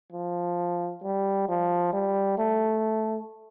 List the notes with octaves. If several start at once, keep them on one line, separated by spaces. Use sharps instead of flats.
F3
G3
F3
G3
A3